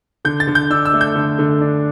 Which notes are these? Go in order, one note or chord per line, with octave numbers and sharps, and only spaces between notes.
D3 G6
A6
D3
G6
D4 E6
E6
A3
G6
D3
D3
D4